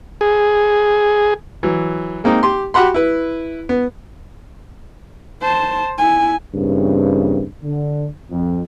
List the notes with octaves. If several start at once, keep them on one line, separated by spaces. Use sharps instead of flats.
G#4
E3 F#3
G#3 A#3 C4 D#4
G4 C6
F#4 G4 F#5 B5 C6
E4 B4
B3
C5 A5
E4 G#5
G2 C#3 E3 A#3 C4
D3
F2